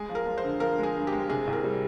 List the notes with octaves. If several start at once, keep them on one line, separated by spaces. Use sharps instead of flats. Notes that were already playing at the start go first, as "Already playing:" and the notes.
Already playing: G#3 G#4
F3
A#4
F3
C5
D3
F3 A#4
G#3
G#4
G2
G4
G#3
C3 G#4
C2
A#4
G3